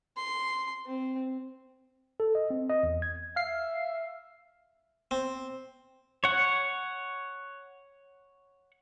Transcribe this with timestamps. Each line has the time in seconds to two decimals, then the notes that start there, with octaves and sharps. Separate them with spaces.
0.17 C6
0.86 C4
2.20 A4
2.35 D#5
2.50 C4
2.70 D#5
2.83 E2
3.02 G#6
3.36 E5 F5 C7
5.11 C4
6.24 C#5 F#5